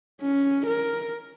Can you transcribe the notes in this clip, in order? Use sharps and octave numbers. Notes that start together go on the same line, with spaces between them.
C#4
A#4